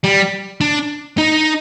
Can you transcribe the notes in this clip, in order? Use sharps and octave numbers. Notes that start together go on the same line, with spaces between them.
G3
D4
D#4